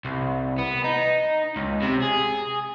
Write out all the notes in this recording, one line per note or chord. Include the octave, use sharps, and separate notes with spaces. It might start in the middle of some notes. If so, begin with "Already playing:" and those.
C2
B3
D#4
C#2
C3
G#4